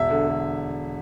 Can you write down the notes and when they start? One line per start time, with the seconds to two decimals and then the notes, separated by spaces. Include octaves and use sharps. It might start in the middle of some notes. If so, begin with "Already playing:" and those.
Already playing: E1 E5
0.10 D3
0.27 D3